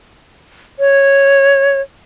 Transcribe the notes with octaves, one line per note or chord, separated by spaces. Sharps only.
C#5